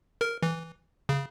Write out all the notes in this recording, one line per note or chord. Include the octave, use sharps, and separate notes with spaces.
A#4
E3
C#3